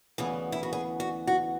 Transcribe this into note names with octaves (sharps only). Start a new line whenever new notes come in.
D2 C#3 E3 B3 G#4
E4
F#4
G#4
F#4
F#4